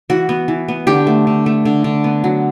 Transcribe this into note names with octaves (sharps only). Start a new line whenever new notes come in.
E3 F#4
B3
E3
B3
D3 G4
A3
D3
A3
D3
D3
B3
F#3